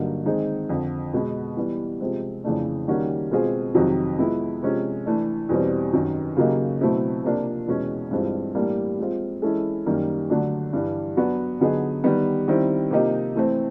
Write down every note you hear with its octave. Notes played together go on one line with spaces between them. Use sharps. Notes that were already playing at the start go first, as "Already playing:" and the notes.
Already playing: G2 D3 F#3 A#3 D#4
D#3 G#3 C4 D#4 G#4
F2 D3 F3
B2 G#3 B3
E3 G3 B3
C3 F3 G#3 C4
F2 C#3 E3 A3 D4
D#3 G3 A#3 C#4 F#4
B2 G#3 C4 F4 G#4
F2 C3 D#3 F#3
F3 G#3 B3 E4
C3 F3 G#3 C#4
E3 A3 D4
E2 B2 G3 C4
F#2 D#3 F#3
C#3 F#3 A#3 D#4 G4
B2 F#3 A3 C4 E4
C3 F3 A#3 D4 F4
E2 B2 G#3 C#4
G2 E3 G#3 C4 F4
A2 E3 G3 A#3 D4
F3 G#3 C4 F4
E3 G#3 C#4 E4 A4
F#2 D#3 G3 A#3
D3 F#3 A3 D4
G2 E3 G3
F#3 B3 D4 F#4
D3 F#3 B3 D#4 G#4
D#3 G3 B3
D#3 G3 C4 E4
C3 F3 A#3 D#4 G4
E3 A3 C4